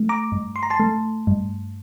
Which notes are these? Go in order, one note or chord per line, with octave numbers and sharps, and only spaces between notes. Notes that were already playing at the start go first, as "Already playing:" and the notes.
Already playing: A3
A#5 D6
G2
C6
A#5
A5 C6
A3
G2